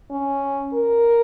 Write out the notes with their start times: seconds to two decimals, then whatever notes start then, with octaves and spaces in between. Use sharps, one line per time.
0.11 C#4
0.74 A#4